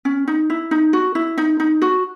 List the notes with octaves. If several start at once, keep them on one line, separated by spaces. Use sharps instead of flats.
C#4
D#4
E4
D#4
F#4
E4
D#4
D#4
F#4